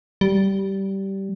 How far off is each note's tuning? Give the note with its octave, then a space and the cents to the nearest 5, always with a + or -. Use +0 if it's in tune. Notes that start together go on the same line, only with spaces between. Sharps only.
G3 -15